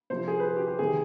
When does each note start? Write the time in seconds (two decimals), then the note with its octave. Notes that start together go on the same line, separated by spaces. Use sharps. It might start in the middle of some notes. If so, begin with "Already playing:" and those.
0.10 C3 F3 C5
0.28 G#4
0.39 B4
0.45 G#4
0.57 G4
0.67 G4
0.79 C3 D#3 G#4